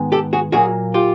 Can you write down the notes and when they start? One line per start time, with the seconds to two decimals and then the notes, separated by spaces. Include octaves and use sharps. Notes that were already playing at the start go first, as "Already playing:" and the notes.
Already playing: G#2 D#3 G#3 B3
0.12 G4 A4
0.33 F#4 G#4
0.52 A#2 F#3 A#3 F#4 G#4
0.94 F4 G4